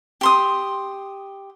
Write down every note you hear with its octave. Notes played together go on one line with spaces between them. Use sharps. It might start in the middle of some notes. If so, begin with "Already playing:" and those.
G4 C6 D#6